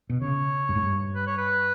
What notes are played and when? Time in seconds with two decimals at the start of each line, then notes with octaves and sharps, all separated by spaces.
0.10 B2
0.22 C#3 C#5
0.69 G2
0.75 G#2
0.83 G2
1.15 B4
1.27 C#5
1.38 B4